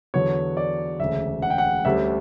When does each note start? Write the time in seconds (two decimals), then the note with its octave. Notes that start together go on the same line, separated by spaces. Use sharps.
0.14 E2 D3 F#3 B3 C#5
0.57 D5
1.00 E1 D2 C#3 E5
1.42 F#5
1.50 G5
1.58 F#5
1.85 D2 D3 G3 C#4 E5